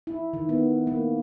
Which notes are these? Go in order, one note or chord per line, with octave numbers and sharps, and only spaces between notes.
E4
D#3
B3
A#3